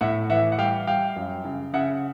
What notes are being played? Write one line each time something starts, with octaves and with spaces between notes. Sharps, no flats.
A2 E5 F#5
E3 E5 F#5
F#5
G3 F5 G5
G3 F5 G5
F#2
C#3
C#3 E5 F#5